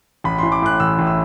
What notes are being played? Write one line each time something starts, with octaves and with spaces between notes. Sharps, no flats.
A1 B5
E3 C6
D6
A2 F#6
A1 E6
A1
E6